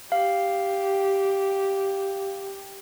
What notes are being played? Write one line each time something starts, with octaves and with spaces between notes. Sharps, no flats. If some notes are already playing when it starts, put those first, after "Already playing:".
G4 F5